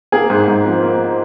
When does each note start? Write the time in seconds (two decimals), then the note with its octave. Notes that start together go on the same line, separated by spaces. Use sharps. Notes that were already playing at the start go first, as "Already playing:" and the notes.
0.12 A#3 G#4
0.30 G#2
0.48 G#2
0.65 F3
0.83 A#3